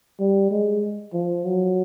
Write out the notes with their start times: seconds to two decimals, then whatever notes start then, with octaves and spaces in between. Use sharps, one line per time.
0.20 G3
0.51 G#3
1.13 F3
1.45 F#3